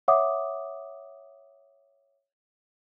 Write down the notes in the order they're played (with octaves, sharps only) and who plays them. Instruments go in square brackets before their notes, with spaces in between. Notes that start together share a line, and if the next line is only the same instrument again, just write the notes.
[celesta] C#5 E5 F#5 D6 D#6